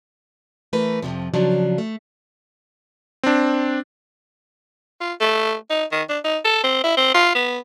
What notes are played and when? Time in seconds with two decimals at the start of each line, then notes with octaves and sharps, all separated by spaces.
0.73 E3 A3 A#4 B4
1.02 F2 A2 C3 F3
1.34 C#3 F3 F#3 D4
1.78 A3
3.23 C4 D4
5.01 F4
5.21 A3
5.70 D#4
5.92 D#3
6.09 D4
6.24 D#4
6.44 A4
6.63 C4
6.84 E4
6.97 C4
7.14 F4
7.35 B3